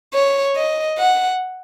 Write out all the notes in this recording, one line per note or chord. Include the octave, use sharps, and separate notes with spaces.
C#5
D#5
F#5